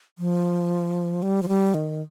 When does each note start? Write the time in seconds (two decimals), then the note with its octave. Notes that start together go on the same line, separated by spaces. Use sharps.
0.19 F3
1.22 G3
1.43 F3
1.48 G3
1.74 D#3